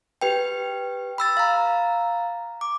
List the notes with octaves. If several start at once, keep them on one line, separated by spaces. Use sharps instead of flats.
G4 B4 G5
B5 E6 A6
F5 A#5
D6